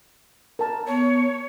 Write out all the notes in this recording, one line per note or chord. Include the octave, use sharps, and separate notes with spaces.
A#4 A5
B3 C#5